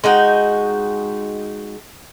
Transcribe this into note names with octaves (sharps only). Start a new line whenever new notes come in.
G#3 D#4 F#4 G5